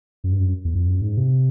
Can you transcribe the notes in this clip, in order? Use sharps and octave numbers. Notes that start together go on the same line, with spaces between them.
F#2
G2
F#2
E2
F2
F#2
G#2
C3